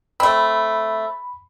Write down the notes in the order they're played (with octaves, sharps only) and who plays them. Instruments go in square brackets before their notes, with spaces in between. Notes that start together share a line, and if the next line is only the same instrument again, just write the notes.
[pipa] A3 C4 [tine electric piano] B5